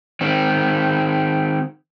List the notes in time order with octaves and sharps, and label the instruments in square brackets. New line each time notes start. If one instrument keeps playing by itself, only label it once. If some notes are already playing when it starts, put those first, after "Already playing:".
[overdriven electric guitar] D#3 C4